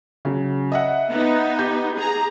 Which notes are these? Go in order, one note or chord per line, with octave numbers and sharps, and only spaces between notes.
C#3 F#3
D#5 E5 F#5
B3 D#4
G4 G6
G#4 A#5